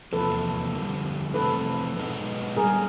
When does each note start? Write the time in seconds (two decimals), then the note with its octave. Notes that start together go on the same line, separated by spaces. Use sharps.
0.13 E2 C3 F3 A#3 A4 B4
0.74 F2 D3 G3
1.34 F2 C3 E3 A3 C4 A4 B4
1.96 B2 G#3 B3 D#4
2.56 A#2 G3 B3 G#4 A#4